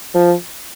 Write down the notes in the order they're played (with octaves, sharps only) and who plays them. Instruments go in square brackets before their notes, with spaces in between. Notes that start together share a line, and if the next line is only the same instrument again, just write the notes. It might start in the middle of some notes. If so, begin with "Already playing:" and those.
[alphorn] F3